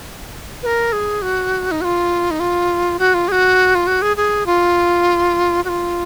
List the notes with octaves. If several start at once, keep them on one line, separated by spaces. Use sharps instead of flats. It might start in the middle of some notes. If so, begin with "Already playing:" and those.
B4
A#4
G#4
F#4
D#4
F#4
F4
D#4
F4
F#4
F4
G#4
F#4
F4
F#4
G#4
G#4
F4
F#4
F4